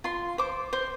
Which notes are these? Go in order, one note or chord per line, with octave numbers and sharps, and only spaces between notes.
F4 C6
C5 D6
C5